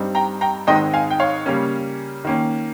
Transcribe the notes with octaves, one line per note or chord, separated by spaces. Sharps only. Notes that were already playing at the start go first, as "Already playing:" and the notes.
Already playing: G2 G3 C4 D#4
G5 A#5
G5 A#5
G#2 D#3 G#3 C4 D#4 D#5 G5
F5 G#5
G5
C#5 F5
C#3 G3 A#3 C#4
D#3 A#3 C#4